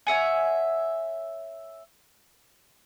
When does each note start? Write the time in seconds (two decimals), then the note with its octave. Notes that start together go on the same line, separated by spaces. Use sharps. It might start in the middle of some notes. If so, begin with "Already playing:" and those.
0.07 C#5 E5 F#5 G#5